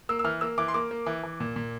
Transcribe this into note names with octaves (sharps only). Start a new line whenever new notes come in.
A#3 E6
E6
E3 F6
A#3 E6
E3 D6
C6
A#3 D6
A#3
E3
E3
A#2
A#2